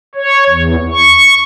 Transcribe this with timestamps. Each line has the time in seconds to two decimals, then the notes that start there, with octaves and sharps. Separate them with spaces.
0.15 C#5
0.50 E2
0.92 C#6